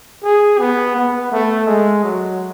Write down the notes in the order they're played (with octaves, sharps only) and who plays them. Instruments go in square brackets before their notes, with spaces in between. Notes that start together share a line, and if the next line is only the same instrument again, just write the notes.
[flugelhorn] G#4
B3
B3
A3
G#3
F#3